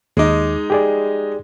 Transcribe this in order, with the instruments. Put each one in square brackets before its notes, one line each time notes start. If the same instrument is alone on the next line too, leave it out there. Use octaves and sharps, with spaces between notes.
[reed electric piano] D#2 D6 [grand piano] G#3 D#4
[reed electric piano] G4 G#4 D5